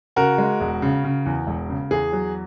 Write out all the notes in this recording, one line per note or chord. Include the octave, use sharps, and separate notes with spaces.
C#3 F#4 A#4
G#3
E1
C#3
C#3
E2
E1
C#3
E2 G#4
F#3